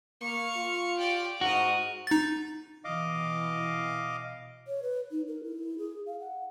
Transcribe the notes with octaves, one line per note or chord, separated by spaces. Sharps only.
A#3 F5 C#6
F4
G4 D5
G#2 F#4 A#4 D#5
D#4 A6
B2 E3 D#5 F5 D6
C#5
B4
D#4
A#4
E4
G#4
F5
F#5